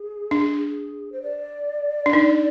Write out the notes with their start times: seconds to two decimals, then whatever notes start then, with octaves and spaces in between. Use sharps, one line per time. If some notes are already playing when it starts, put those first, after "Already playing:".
Already playing: G#4
0.31 D4
1.12 C5
1.23 D5
2.06 D4
2.13 D#4